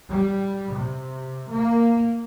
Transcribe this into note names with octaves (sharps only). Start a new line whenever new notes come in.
G3
C3
A#3